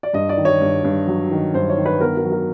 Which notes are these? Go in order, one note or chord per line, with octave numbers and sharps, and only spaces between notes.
D5
G2 D#5
D5
D#3
C#5
G2
G2
F#3
D#3
G2 C5
C#5
D#3
B4
B3 A#4
A#4
F#3
A#4